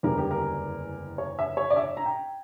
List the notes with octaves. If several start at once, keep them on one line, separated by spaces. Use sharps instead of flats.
F#1 E2 D3 G3 B3 A#4
G4
A#4
C#5
E5
C#5
D5
E5
A#5
G5